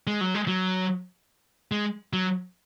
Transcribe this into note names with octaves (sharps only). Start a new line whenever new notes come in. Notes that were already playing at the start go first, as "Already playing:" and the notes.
G#3
F#3
G#3
F#3
G#3
F#3